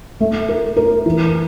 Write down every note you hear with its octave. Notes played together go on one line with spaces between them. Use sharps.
A3
A#4
A#4
E3